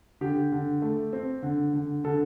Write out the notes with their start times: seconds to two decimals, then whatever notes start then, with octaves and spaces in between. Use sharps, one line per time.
0.21 D3 G4
0.52 D3
0.82 A3
1.13 C4
1.43 D3
1.73 D3
2.04 D3 A4